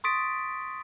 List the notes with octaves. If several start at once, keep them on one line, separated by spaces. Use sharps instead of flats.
C6 C#6 D#6 A6 B6 D7